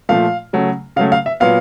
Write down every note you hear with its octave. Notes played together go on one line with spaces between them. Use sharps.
A#2 F3 A3 F5
C#3 F#3 A3
C#3 F#3 A3 F5
F5
E5
A#2 F#3 B3 F5